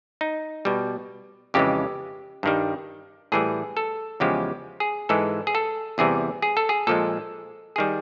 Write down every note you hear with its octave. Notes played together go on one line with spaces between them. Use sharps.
D#4
B2 G3
F2 C#3 E3 G#3 G4
G2 D#3 G3
A2 E3 G3 G#4
A4
E2 C#3 F3 G#3 G4
G#4
G#2 E3 G#3 A4
G#4
A4
E2 C3 E3 G3 G#4
G#4
A4
G#4
A#2 F3 G#3 A4
D#3 G3 G#4